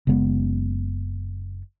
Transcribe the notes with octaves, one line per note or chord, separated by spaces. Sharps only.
F#1 C#3 G#3 B3